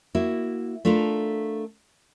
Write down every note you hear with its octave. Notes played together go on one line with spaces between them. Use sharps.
A#3 E4 F#4
A3 D4 F4 A4 A#4